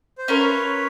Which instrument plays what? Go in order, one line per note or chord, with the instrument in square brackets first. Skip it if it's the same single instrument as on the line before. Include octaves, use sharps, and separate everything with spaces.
[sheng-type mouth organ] C5
[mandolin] C#4 F4 A#4 [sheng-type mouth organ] B4 C#5